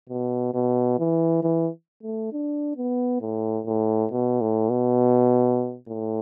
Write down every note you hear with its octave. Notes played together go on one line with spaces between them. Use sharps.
B2
B2
E3
E3
A3
D4
B3
A2
A2
B2
A2
B2
A2